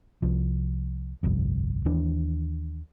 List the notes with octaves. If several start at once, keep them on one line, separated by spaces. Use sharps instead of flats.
C2 F3
G1 C2 F2
D#2 E3 D4